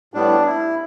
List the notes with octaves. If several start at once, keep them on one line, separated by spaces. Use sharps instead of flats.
A2 G3 B3 D4
E4